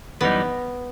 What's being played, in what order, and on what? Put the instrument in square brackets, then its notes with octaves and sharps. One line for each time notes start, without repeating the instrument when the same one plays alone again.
[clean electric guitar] F#2 E3 G3 D#4 [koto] B3